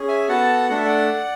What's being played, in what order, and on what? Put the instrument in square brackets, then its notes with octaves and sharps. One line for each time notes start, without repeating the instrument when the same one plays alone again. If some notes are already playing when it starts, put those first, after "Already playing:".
Already playing: [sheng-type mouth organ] C#4 G#4
E5 G#5
B3 F#4 A4 F#5 A5
A3 D4 A4 F#5
E5
D5 F#5